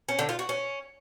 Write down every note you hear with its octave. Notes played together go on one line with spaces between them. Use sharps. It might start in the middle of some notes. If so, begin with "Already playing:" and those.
C#4
D3
F4
F#4
C#4